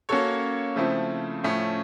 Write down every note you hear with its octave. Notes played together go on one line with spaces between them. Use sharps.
A#3 C#4 F#4 A4 C#5
C#3 F3 A3 C4 E4
A2 F3 A3 C#4